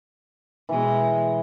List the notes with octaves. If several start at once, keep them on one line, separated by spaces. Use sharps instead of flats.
B2 E3 G#3